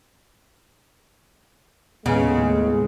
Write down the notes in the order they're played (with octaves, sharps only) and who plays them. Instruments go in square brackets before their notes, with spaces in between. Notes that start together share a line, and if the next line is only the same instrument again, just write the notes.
[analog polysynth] D#2 A2 [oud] C#3 [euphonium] G#3 [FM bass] B3